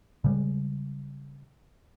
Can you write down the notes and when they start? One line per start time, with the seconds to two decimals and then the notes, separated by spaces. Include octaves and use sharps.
0.24 C#3 G3 G#3